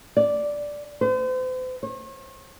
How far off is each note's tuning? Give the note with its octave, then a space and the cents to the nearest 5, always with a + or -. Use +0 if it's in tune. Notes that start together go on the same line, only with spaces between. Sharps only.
D5 -5
C5 -40
C#5 -45